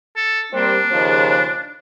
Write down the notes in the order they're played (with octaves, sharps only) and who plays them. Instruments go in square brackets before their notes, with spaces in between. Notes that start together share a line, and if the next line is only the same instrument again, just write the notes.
[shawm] A4
[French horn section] G3 A#3 C4 [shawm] D4
[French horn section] D#2 C#3 F3